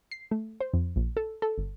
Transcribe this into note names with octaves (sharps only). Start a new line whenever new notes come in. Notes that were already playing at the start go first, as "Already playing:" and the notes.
C7
A3
C5
F2
A#1
A4
A4
G1